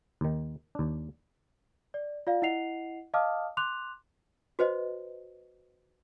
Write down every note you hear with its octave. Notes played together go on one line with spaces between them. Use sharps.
D#2 D#3
D#2 D4
D5
F4 D5 F5
E4 D#5 F#5 C7 F7
D#5 F5 A5 D6 D#6 F6
C6 D6 F#6 F7
F#4 B4 C5 D#5